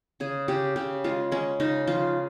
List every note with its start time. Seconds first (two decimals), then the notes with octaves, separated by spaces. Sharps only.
0.20 C#3 G#4
0.48 C#3 G4
0.76 C#3 G4
1.04 G#3 F4
1.32 G#3 C#4
1.60 C#3 D#4
1.87 F3 F4